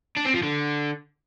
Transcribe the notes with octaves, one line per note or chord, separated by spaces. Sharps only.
D4
C4
F3
D3